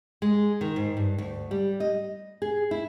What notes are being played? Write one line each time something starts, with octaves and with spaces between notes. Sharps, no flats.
G#3
D#3
G#2
G2
D2
G3
D#5
G#4
E4